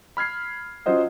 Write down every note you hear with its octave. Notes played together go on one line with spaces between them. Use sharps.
B5 F6 G#6 C7
F#3 C#4 F4 C5 D#5 F#5